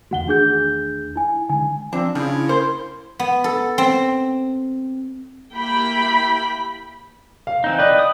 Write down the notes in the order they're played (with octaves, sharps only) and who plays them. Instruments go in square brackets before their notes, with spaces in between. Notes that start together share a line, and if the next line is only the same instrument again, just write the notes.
[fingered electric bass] E2 D#3 A3 [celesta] F#4 F#5 G7
[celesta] D4 G#4 G6
E4 G#5
[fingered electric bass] D3 D#3 G#3 [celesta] G#5
[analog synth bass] F3 [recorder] C4 [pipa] D4
[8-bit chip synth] C#3 [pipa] F3 [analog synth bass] D4 [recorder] E4
[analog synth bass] A#3 [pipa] C5
[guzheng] B3
A4
C4
[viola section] A#3 E4 G4 G5 B5
[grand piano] F5
[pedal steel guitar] E3 C4 D#4
[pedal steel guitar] B4 [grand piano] D5 D#5 [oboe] G5
[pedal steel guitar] D#6